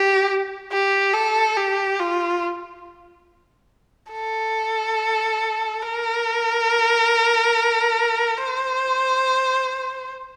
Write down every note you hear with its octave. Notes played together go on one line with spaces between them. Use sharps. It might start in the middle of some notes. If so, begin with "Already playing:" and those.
Already playing: G4
G4
A4
G4
F4
A4
A#4
C5